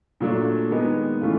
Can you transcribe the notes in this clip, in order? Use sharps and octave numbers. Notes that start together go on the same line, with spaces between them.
A#2 F#3 A3 D4
D#3 G#3 B3 D#4
A2 E3 A3 C#4 F4